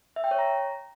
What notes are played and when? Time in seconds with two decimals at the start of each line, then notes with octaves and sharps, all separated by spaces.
0.16 E5
0.24 G5
0.31 C#5
0.39 A#5